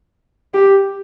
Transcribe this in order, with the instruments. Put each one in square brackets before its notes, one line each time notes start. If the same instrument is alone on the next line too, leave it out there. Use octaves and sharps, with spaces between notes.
[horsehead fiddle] G4